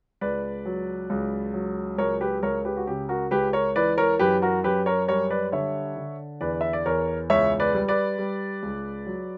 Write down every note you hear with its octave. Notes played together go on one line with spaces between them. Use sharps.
C#2 B4 D5
F#3
C#2
F#3
C#2 A#4 C#5
G4 B4
C#2 A#4 C#5
G4 B4
F#4
C#3 G4
F#4 A#4
C#2 G4 B4
A#4 C#5
E3 B4 D5
A#4 C#5
F#2 G4 B4
F#4 A#4
F#2 G4 B4
A#4 C#5
G3 A#4 C#5
B4 D5
D3 C#5 E5
D3
E2 B4 D5
E5
D5
E2 A#4 C#5
C#2 C#5 E5
B4 D5
G3
B4 D5
G3
C#2
F#3